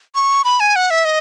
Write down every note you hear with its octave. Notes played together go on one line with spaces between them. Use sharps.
C#6
B5
G#5
F#5
E5
D#5